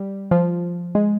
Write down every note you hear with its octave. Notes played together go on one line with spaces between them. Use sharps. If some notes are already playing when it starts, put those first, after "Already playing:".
Already playing: G3
F3
G#3